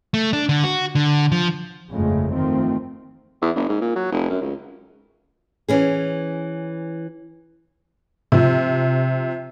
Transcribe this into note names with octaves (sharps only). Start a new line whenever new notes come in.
A3
D4
D3
F#4
D3
F3
G1 F2 G#2 C#3 G#3 A3
D#3 F3 A3 C4
E2
F#1
G#2
A#2
F#3
F1
F#2
C#2
E3 C#4 G#4
C3 F3